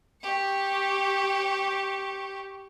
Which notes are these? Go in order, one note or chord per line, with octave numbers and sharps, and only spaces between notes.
G4 C#6